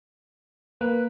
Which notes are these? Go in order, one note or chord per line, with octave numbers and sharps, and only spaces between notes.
A#3 B4